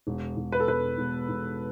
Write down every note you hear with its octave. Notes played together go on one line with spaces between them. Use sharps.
E1
E1
B4
A4
E1 B4
E1
E1